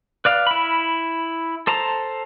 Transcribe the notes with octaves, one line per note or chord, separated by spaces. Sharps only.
B4 D5 F5
E4 B5
A4 C5 A5 A#5